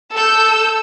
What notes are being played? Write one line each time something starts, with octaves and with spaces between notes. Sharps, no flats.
A4 E6 G6